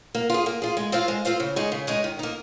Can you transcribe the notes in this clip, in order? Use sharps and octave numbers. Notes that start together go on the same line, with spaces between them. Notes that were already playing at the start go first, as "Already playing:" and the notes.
A#3
F4 G#4
A#3
F4 G#4
G#3
C4 F4 C5 F5
G#3
C4 F4 C5 F5
C#3
G#3 D#4 G#4 C#5
C#3
G#3 D#4 G#4 C#5
D#3
A#3 D#4